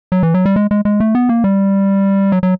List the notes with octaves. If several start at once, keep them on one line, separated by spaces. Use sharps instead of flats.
F#3
E3
F#3
G3
G#3
G#3
G#3
A3
B3
A#3
G3
F#3
F#3